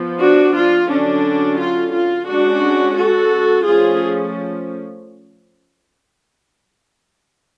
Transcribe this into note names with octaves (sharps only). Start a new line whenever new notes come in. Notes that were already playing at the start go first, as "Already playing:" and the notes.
Already playing: F3 B3
D4 F#4
F4
D3 F#3 C#4 D4
F4
F4
G#3 C#4 D4 F#4
F#4 A4
F3 A3 C#4 F4 G#4